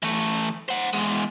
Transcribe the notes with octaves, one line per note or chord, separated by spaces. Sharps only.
E3 A3
C5 F#5
E2 G#3